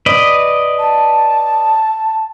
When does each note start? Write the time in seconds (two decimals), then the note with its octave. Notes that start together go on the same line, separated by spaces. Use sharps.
0.06 B4 D5 D#5
0.79 A5